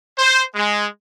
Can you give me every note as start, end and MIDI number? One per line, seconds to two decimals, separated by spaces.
0.18 0.42 72
0.55 0.86 56